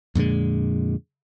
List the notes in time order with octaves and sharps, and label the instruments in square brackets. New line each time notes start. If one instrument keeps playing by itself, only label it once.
[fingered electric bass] F2 A#2 D3 G#3